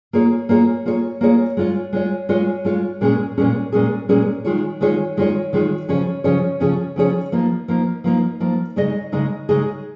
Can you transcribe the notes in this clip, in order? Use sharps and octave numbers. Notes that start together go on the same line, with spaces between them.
A#3 F4 G#4 C#5
A#3 F4 G#4 C#5
A#3 F4 G#4 C#5
A#3 F4 G#4 C#5
G#3 F4 C#5
G#3 F4 C#5
G#3 F4 C#5
G#3 F4 C#5
A#2 G#3 C#4 G#4
A#2 G#3 C#4 G#4
A#2 G#3 C#4 G#4
A#2 G#3 C#4 G#4
D#3 G#3 F4 G#4 C#5
D#3 G#3 F4 G#4 C#5
D#3 G#3 F4 G#4 C#5
D#3 G#3 F4 G#4 C#5
C#3 F3 C#4 G#4 C#5
C#3 F3 C#4 G#4 C#5
C#3 F3 C#4 G#4 C#5
C#3 F3 C#4 G#4 C#5
F3 A#3 D#4
F3 A#3 D#4
F3 A#3 D#4
F3 A#3 D#4
C#3 G#3 D#4 G#4 D#5
C#3 G#3 D#4 G#4 D#5
C#3 G#3 D#4 G#4 D#5